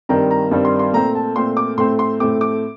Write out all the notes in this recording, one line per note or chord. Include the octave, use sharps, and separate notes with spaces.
G2 D#3 G3 C4 A#5
A#5
G2 D#3 G3 C4
C6
C6
A#2 A3 C4 A#5
A5
A#2 A3 C4 C6
D6
A2 A3 C4 C6
C6
A2 A3 C4 D6
D6